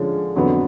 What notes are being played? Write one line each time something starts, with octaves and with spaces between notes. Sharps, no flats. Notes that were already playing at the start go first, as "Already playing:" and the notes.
Already playing: D3 F3 G#3 C#4
F2 D3 F#3 B3